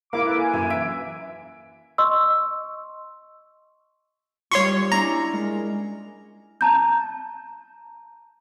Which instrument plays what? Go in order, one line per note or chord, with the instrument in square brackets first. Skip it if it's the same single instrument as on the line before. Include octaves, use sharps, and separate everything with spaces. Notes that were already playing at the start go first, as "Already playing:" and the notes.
[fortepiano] A#3 E4 [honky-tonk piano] F5 [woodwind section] D6
[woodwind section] A4 B4
G#5
[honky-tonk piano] F#2
[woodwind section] E3 [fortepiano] E5 [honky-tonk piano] D7
[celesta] D#5 C6 C#6 E6
[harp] G3 D#4 F4 [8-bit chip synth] C#5 C6 C#6
[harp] C#4 D4 E4 [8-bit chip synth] A#5
[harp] G#3 A#4
[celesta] A5 A#5 G6